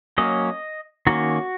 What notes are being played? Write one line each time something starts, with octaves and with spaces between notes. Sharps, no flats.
F#3 A#3 C#4 D#5
D#3 A#3 C#4 F#4